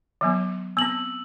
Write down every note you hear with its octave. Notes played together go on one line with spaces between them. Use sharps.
D#3 F#3 B3
B3 C4 E6 F#7